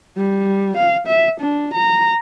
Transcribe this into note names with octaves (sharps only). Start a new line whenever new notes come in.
G3
F5
E5
D4
A#5